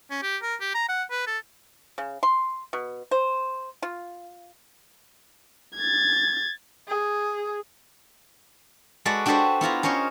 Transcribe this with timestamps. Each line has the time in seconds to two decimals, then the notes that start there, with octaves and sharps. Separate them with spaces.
0.11 C#4
0.23 G4
0.42 A#4
0.61 G4
0.75 A#5
0.89 F#5
1.11 B4
1.27 A4
1.98 C#3
2.23 C6
2.73 B2
3.11 C5
3.82 F4
5.76 G#6 A6
6.88 G#4
9.05 G#3 F#4 A4 B4 D5
9.26 D4 F#4 G4 A4 B4 C5
9.61 B3 E4 F4 A#5
9.83 C#4 A#4 C5 C#5 D#5